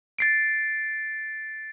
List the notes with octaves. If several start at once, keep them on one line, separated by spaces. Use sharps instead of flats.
A6 C7 D7